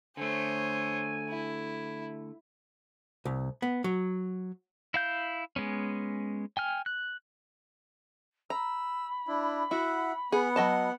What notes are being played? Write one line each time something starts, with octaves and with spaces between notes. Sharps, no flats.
D3 A3 C5 C#5 G#5
E4
C2
B3
F#3
E4 F5 G6
G#3 B3 C#4
G5 G#5 F6
F#6
A#5 B5 E6
D4 E4
E4 F#4 E5 F#5
B3 G#4 F#5
F#3 D#5 A5